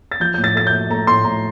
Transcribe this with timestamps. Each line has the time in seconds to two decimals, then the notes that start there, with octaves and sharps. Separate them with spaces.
0.11 A6
0.20 F3 G6
0.34 A2 G6
0.44 A6
0.55 A3 A6
0.67 G6
0.73 A3
0.90 A3 A#5
1.07 A2 C6
1.24 A2 A#5